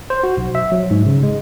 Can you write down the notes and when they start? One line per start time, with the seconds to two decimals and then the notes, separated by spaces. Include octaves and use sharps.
0.10 C5
0.23 F#4
0.37 B1
0.55 E5
0.72 F#3
0.91 G#2
1.06 C#3
1.23 G#3